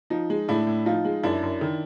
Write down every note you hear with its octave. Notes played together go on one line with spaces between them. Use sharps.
F3 D#4
G#3
A2 D4 E4
A2
F3 D#4 F4
G#3
F#2 D4 E4
F#2
D#3